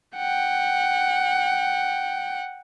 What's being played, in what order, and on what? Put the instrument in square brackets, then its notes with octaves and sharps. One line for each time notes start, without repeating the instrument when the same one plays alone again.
[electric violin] F#5 G5